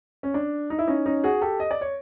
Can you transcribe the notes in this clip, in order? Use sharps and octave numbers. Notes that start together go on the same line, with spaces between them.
C#4
D4
D#4
E4
C#4 D#4
C#4 D#4
F#4 G#4
G4 A4
D#5
D5
C#5